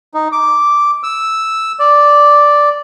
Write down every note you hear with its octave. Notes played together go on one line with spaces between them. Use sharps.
D#4
D6
E6
D5